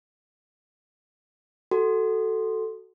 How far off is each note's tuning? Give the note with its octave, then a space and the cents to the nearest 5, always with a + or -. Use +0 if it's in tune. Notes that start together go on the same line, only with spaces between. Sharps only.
F#4 +20 A4 +0